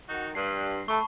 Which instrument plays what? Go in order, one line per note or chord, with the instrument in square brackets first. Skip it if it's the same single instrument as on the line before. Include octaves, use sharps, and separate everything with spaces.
[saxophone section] D#3 D#4 F#4
[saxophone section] G2 [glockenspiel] C7
[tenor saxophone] A3 [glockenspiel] A5 B5 C#6